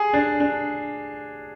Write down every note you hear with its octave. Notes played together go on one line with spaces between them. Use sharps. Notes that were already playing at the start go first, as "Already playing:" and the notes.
Already playing: G#4
D4
D4